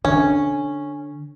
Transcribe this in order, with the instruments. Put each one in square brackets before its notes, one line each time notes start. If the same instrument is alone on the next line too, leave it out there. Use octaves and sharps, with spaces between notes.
[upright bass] D3 [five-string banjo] C#4